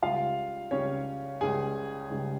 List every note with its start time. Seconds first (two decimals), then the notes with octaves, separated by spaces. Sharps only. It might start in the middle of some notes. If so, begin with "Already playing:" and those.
0.02 C#2 C#3 G3 F4 F5
0.71 C#2 C#3 G3 C#4 C#5
1.41 C#2 C#3 G3 G#4 G#5
2.10 C#2 C#3 G3